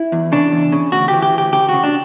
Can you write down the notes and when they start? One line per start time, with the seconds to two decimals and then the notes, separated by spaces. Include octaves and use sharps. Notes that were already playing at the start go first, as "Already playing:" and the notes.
Already playing: E4
0.12 E2
0.32 C#3 D4
0.52 E2
0.72 C#3
0.92 D2 F#4
1.08 G4
1.13 E3
1.22 G4
1.33 D2
1.38 G4
1.53 C#3 G4
1.69 C#3 F#4
1.84 D4